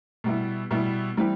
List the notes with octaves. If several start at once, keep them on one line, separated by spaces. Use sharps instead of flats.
B2 G3 B3 E4
B2 G3 B3 E4
E3 G3 C4